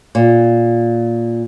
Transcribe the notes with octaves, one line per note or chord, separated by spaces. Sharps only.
A#2